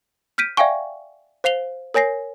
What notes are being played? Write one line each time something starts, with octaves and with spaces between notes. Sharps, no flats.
F6 G6 B6 D7 D#7
D5 E5 F5 G5 G#5 C#6
C5 F5 C7 F7 G7
A#4 C#5 G#5 A#6 C7